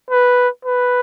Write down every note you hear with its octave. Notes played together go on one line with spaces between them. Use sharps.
B4
B4